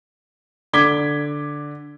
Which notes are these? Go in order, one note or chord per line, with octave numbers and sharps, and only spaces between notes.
D3 D6 G#6 B6 G7